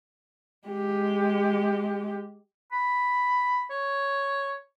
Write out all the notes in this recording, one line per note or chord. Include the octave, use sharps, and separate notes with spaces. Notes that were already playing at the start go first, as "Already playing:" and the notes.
G#3 G4
B5
C#5